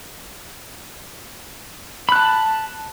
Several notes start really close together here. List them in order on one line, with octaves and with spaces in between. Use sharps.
B5 F#6 A5